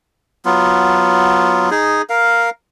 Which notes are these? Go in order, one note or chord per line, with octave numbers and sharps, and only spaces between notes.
F#3 B3 F4
D#4 G#4
A#4 F5